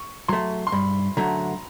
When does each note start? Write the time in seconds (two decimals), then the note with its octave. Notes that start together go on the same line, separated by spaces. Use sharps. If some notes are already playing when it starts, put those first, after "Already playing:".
Already playing: C#6
0.28 F#3 A3 C6
0.67 C6
0.72 G2 B5
1.17 D3 F#3 A3 A#5